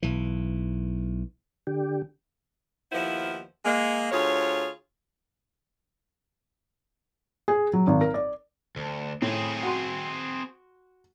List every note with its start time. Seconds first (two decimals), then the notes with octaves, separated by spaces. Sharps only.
0.03 B1 E3
1.67 D3 G4
2.92 D#2 F3 B3 E4 C5
3.65 G#3 A#3
4.12 D2 F4 G#4 C#5
7.48 G#4
7.73 F#3
7.87 G#1
8.01 A#4
8.14 D5
8.76 D2
9.22 A2 C4 G#4
9.63 F#4 C6